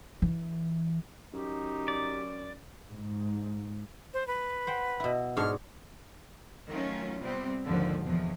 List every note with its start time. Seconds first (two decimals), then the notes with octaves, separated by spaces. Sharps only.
0.22 E3
1.34 F#2 D#4 G4
1.88 D5
2.90 G#2
4.14 C5
4.27 B4
4.67 C5 F#5 G5
5.00 B2 E4
5.37 G#2 D4 C#5 F6
6.69 D#3 F#3 A3 C#4 F4
7.21 C3 G3 B3 C4
7.64 D#2 G#2 D3 F3
8.03 E2 B2 F3